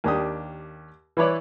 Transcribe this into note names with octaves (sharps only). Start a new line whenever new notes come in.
D#2 A#3 D4 G4 D#6
E3 E4 B4 C#5 D5